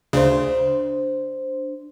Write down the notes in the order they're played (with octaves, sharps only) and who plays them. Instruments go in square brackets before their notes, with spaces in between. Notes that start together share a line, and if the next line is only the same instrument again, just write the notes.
[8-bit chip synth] D2 C#3 [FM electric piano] D4 C5